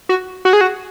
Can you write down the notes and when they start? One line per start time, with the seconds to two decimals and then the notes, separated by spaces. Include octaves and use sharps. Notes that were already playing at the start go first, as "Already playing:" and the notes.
0.09 F#4
0.45 F#4
0.53 G#4
0.61 F#4